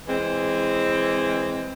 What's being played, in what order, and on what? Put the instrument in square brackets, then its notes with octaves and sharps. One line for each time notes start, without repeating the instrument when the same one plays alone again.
[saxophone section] E3 G#3 C4